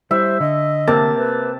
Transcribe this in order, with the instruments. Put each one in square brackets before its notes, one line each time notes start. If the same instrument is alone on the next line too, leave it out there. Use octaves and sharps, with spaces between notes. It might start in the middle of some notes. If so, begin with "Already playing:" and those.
[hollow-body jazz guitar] G3 E4 [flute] C5 [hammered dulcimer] E5
[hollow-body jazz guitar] D3 [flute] D#5
[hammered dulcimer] C3 A5 [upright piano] A#3
[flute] B4